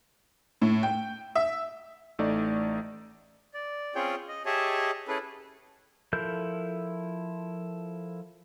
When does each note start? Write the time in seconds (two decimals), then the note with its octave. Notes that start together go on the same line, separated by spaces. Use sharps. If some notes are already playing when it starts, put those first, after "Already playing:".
0.62 A2
0.83 G5
1.35 E5
2.19 A1 A3 D#4 D5
3.54 D5
3.95 C4 C#4 F4 G#4 C#5 G5
4.28 D#5
4.46 G4 G#4 C#5 D#5 E5 A5
5.08 C#4 E4 G#4 A4 B4
6.13 F3 E4 A4 A#4 G6